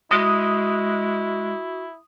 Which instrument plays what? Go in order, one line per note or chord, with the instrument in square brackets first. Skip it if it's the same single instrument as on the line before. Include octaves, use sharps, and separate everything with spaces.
[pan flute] G#3 [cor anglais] E4 [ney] F#4 [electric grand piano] D#6